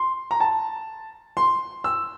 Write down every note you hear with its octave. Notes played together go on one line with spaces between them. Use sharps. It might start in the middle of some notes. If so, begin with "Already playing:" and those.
Already playing: C6
A#5
A5
C6
E6